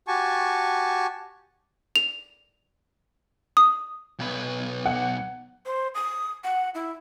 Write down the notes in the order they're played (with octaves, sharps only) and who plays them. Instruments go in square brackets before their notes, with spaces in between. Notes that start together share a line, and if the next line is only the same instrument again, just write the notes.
[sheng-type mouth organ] F#4 G4 G#5 A5 C#6
[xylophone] F7
D#6
[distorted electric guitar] B1 B4
[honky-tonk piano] F#5
[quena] C5
D#6
F#5
E4